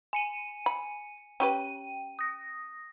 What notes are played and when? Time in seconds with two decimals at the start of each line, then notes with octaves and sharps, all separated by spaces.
0.13 G#5 C#7 D#7
0.66 B5
1.40 C#4 G4 B4 G5 D#7
2.19 D#6 A#6